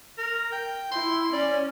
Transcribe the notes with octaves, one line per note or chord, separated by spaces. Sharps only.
A#4
G5
E4 C6
C#4 D5